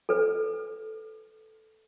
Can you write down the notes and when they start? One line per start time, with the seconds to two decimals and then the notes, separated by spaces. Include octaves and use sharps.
0.09 A4 B4